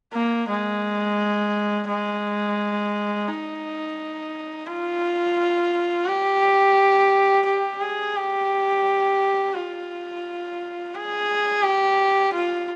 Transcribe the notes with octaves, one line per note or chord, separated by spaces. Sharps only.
A#3
G#3
G#3
D#4
F4
G4
G4
G#4
G4
F4
G#4
G4
F4